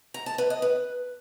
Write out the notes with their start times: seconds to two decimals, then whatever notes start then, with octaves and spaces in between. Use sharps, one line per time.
0.14 A#5
0.26 A5
0.38 B4
0.50 D#5
0.62 B4